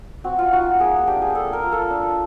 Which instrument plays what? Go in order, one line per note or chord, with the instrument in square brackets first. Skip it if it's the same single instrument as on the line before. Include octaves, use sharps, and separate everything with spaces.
[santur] C4 F#4
F4
D#4 F#4
A#3 G#4
D4 G4
G#4
D4 A4
A#4
F4
A4
D4